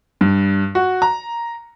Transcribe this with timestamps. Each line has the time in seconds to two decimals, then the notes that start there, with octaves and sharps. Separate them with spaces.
0.21 G2
0.75 F#4
1.02 A#5